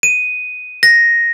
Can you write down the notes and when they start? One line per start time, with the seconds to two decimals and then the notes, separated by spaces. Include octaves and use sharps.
0.03 D#7
0.83 A#6